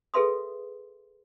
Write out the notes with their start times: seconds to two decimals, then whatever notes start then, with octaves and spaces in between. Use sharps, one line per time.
0.14 G#4 A4 B4 E5 C6 D#6